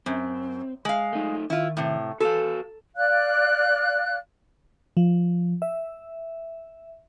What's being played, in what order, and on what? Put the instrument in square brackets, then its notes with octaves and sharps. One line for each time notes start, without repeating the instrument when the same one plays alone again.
[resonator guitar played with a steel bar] F#2 [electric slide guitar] C4
[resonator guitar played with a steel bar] G#3 F5
[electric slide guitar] A3 D#4
[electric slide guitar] D#3 [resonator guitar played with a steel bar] E4 F4
[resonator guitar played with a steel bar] A2 C3
[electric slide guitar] F#4 B4 F5 [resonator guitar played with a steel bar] A4
[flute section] D5 F5 F#6
[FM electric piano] F3
E5